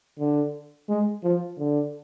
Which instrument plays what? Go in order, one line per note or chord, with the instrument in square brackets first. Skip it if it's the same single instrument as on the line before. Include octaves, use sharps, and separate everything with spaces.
[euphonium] D3
G#3
F3
D3